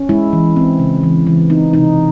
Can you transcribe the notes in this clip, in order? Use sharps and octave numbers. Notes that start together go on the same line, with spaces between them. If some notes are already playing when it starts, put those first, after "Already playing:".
Already playing: C#4
G#3 E4
E3
C4
C#3
E3
E3
C4 D#4
C3 D#4